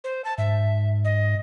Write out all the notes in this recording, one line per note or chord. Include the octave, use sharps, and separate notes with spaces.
C5
A5
G#2 E5
D#5